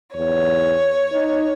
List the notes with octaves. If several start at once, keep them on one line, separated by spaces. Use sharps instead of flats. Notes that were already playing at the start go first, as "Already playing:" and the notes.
E2 C#5
D#4